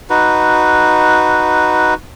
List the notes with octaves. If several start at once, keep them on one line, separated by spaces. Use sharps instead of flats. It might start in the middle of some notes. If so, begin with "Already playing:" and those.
D#4 F#4 B4